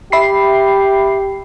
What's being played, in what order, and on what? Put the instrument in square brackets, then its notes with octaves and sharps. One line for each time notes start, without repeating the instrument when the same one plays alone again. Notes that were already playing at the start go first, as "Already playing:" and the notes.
[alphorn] G4 [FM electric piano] E5 B5 C7